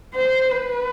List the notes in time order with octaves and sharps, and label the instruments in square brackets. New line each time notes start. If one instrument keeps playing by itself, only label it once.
[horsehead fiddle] C5
B4